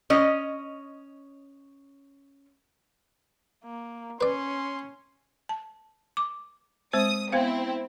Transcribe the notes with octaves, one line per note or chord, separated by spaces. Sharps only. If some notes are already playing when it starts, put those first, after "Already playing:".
C#4 D#5
A#3
C#4 B4 D5 C6
A5
D6
G#3 C4 C5 D#6
B3 C4 E4 C5 F5